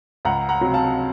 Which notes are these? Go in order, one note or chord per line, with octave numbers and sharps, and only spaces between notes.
C#2 F#5 A#5
F#5 A#5
C3 F#3
F5 A5